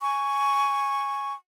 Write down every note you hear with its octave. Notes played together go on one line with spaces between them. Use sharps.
G#5 C#6